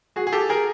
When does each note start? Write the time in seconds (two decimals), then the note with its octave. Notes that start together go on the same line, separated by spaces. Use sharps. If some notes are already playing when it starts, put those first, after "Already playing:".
0.16 F#4 G#4
0.27 G#4
0.32 G4 A4
0.49 G#4 A#4